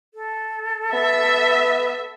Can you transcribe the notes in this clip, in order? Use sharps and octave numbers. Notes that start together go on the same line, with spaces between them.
A4
B3 E5